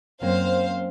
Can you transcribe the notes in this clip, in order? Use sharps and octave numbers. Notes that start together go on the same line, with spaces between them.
F#2 A#3 C4 C5 F5